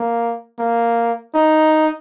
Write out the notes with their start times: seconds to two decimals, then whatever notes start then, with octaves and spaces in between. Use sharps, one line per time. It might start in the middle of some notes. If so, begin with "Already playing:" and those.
Already playing: A#3
0.59 A#3
1.35 D#4